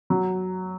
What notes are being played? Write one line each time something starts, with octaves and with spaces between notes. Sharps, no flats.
F#3